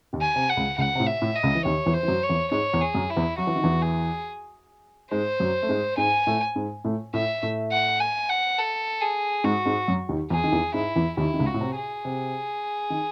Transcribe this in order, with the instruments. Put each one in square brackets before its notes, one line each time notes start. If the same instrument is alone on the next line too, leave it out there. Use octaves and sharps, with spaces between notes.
[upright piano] D#2 D#3
[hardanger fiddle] G#5
[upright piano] C3
[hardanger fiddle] F#5
[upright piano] C#2 C#3
[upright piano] C#2 C#3 [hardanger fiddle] F#5
[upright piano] C3
A2
[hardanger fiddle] E5
[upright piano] A2
[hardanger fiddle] D#5
[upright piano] C#2 C#3
E3
[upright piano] D#2 D#3 [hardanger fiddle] C#5
[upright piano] E2 E3
[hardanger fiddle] C5
[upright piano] E3
F#2 F#3
[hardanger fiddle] C#5
[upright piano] E2 E3
[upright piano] G#2 G#3 [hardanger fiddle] C#5
[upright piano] E2 E3
[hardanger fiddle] G#4
[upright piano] F#2 F#3
[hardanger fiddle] E4
[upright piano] E2 E3
[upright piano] F#3 [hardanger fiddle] F#4
[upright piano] E3
D#3
E2 E3
[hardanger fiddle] G#4
[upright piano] G#2 G#3 [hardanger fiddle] C5
[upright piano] F#2 F#3
A3
G#2 G#3
[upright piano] G#2 G#3 [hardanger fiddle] G#5
[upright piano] A2 A3
G#2 G#3
A2 A3
[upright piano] A2 A3 [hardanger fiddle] E5
[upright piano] A2 A3
[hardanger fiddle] F#5
G#5
F#5
A4
G#4
[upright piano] G#2 G#3 [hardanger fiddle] F#4
[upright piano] G#2 G#3
F#2 F#3
D#2 D#3
[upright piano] E2 E3 [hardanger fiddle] G#4
[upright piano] D#3
E2 E3
[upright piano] G#2 G#3 [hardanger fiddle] E4
[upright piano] E2 E3
[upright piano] D#2 D#3 [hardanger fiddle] E4
[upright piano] D#3
C#2 C#3
[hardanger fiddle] F#4
[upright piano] A2
C3
[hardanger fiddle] G#4
[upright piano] C3
D#3